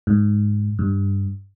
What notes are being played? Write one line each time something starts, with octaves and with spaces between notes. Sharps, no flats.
G#2
G2